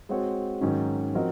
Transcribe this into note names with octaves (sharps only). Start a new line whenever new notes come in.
G#3 C4 F#4 C#5
G#2 D#3 F#3 C#4
F3 C4 F#4 A#4 D#5